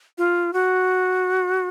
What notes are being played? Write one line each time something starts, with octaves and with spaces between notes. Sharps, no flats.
F4
F#4